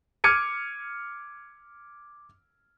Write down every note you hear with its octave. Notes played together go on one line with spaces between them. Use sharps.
D6 F6 G#6 C#7 D#7